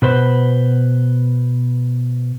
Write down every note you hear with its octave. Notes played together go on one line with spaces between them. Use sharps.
B2 B4 C5